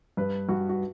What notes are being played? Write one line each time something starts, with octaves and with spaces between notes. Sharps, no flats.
G2 B4
G2 F#4
F#4